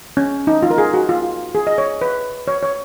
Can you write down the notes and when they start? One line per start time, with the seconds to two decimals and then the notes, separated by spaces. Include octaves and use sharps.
0.17 C#4
0.47 D#4
0.63 F4
0.71 A#4
0.78 G#4
0.94 F#4
1.09 F4
1.55 G#4
1.67 D#5
1.78 C#5
2.01 B4
2.48 C#5
2.63 C#5